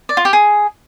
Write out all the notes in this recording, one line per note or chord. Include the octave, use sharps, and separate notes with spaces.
D5
F4
G4
G#4